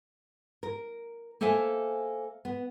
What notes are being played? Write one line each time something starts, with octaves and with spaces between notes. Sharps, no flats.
A#4
A#3 A4 C5 E5 G#5
B3